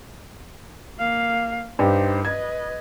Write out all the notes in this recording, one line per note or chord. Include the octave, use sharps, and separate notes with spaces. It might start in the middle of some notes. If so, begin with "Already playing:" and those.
A#3 F5
G2 D#4 G4 C5
B4 D#5 G#6